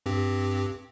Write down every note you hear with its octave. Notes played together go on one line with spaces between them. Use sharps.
G2 C4 G4